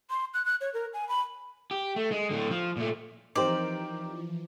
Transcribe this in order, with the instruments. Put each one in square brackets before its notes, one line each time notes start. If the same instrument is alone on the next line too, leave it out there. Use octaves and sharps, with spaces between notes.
[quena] C6
F#6
F#6
C#5
A#4
G#5
B5
[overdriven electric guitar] G4
A3
G#3
A2 D3
F3
A#2 A3
[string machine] E3 F3 [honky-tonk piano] C4 G4 A#4 [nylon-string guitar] D#4 C5 [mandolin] D5